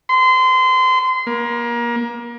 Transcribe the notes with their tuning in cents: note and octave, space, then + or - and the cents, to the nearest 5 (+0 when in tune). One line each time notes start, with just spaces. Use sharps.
C6 -25
A#3 +30